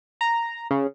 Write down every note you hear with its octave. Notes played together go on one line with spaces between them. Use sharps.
A#5
C#3